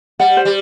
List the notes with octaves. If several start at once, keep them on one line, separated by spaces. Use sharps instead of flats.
G3 F#5
C5
G3